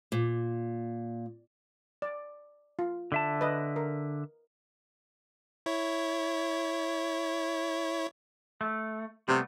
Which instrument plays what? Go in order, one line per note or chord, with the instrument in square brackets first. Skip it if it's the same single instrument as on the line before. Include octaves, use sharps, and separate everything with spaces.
[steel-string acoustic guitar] A#2
[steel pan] D5
F4
[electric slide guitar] D3 E5 A5
[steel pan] B4 D#5
A#4
[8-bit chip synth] E4 C#5
[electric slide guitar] A3
[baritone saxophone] C3 [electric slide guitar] G3 A3 B3